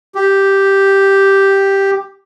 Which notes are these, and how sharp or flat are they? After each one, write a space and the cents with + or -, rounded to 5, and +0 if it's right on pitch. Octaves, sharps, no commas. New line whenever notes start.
G4 +0